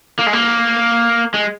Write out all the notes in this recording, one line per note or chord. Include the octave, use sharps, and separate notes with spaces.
A#3
G#3
A#3
G#3